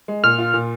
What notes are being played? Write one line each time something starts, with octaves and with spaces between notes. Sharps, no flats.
G#3
A#2 F6
F4
A#2